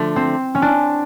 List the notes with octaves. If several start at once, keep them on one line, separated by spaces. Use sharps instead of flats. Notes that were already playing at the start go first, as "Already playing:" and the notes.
Already playing: D3 F3 A3
C4
C#4
D4